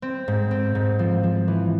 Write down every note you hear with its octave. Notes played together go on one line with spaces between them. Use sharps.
C4
G#2
C4
G#2
F3
F3
E3